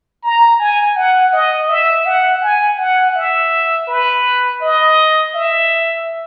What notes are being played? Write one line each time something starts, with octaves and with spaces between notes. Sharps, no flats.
A#5
G#5
F#5
D#5
E5
F#5
G#5
F#5
E5
B4
D#5
E5